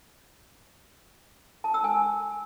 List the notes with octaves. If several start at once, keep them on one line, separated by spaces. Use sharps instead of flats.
A5
E6
G#5